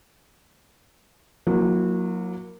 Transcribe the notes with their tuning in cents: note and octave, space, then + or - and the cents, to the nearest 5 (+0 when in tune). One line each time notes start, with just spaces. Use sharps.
F#3 -30 A#3 +0 E4 +0